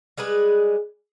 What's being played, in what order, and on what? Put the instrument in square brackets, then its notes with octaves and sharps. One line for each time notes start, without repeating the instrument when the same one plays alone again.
[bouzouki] G3 G#3 G#4 B4